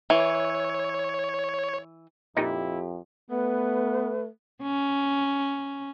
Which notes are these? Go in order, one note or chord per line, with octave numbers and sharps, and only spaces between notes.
E3 C#5
F2 A#2 D#4 E4 G4
A3 B3 B4
C#4